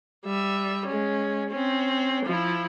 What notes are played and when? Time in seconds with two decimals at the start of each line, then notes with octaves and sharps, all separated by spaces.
0.25 G3 E5
0.86 G#3 C#4
1.50 C4 C#4
2.25 F3 E4